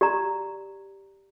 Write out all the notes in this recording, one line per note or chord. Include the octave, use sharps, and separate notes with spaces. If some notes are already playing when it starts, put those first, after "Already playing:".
G4 D5 A#5